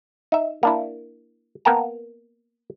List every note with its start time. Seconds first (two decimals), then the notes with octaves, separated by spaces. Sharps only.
0.32 D#4 E5
0.63 A#3 D4 E4
1.65 A#3 B3 A#4 G5 A5 A#5